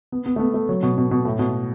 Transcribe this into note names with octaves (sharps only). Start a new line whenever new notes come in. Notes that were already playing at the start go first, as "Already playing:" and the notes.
B3
B3
A3
B3
A3
F#3
B2
B2
B2
A2
B2